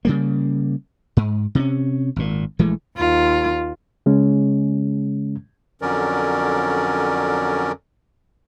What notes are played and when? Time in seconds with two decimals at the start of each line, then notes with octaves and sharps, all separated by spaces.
0.05 C#3 G3 A#3
1.17 G#2
1.55 C3 C4 C#4
2.16 G#1 A#2
2.59 A#1 E3 G#3 A3
2.97 D#2 F4
4.06 C#3 G#3 C#4
5.82 F2 D3 F#3 C#4 A#4 D5